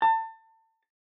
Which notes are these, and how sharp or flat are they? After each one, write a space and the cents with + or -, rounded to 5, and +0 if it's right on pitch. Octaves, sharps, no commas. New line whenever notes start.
A5 +30